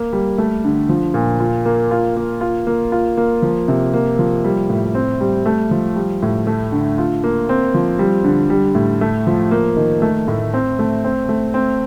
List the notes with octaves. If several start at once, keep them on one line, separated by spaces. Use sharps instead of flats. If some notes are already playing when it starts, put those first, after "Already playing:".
Already playing: A#3
G3
A3
D3
F3
A#2
F4
A#3
F4
A#3
F4
A#3
F4
A#3
F3
C3
A#3
F3
G3
A2
C4
G3
A3
F3
G3
A2
A3
D3
F4
A#3
C4
F3
G3
D3
G3
A2
A3
F3
A#3
D#3
A3
A2
C4
A3
C4
A3
C4